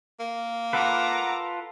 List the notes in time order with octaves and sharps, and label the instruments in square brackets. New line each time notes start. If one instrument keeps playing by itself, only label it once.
[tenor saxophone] A#3
[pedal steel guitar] F4 A4 B4 [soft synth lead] F#5 [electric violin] A#5 D6